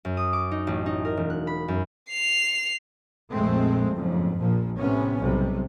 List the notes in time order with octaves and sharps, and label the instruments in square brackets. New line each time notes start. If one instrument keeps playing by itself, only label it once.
[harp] F#2
D#6
D6
D#4
A1
D#4
A#4
E1
F#6
B5
F#2
[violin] C7 F7
[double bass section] A#1 F2 G#3 A3 C4
F#1 F2 G#2
A#1 A#2 F3
A2 C3 B3 C#4
B1 C3 G3